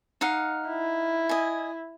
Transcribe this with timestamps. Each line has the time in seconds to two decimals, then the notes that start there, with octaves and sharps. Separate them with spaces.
0.21 D#4 F5 F#5
0.69 E4
1.29 D#5 G#5